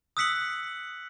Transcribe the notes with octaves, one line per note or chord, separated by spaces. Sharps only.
D#6 E6 F#6 B6 C#7 F#7